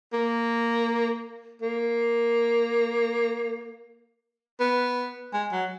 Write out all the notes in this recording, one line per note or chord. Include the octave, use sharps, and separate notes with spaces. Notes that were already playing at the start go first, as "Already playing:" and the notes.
A#3
A#3
B3
G#3
F#3